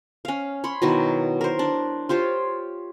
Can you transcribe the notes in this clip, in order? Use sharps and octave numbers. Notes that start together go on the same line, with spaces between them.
C#4 F5
C#5 B5 C6
B2 D#3 F#3 E4
A#4 C5
D4
F4 G4 C5 C#5